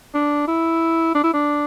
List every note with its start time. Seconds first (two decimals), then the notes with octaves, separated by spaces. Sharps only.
0.15 D4
0.48 E4
1.15 D4
1.24 E4
1.34 D4